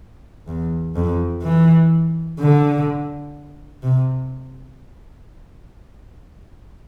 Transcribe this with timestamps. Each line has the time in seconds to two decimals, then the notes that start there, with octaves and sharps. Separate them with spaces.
0.47 E2
0.96 F2
1.43 E3
2.39 D3
3.83 C3